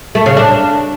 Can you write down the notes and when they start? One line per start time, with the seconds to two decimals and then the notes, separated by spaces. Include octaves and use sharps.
0.15 A3
0.26 C#3
0.37 D4